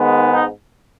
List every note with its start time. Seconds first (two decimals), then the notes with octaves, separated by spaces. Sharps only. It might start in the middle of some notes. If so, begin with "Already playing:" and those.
Already playing: G#2 D#3 G#3 B3
0.31 D#4